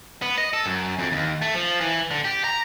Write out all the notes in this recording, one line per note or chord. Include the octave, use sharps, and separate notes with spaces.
B3
D#5
A4
F#2
F2
D#2
A3
F3
E3
D3
G4
A#5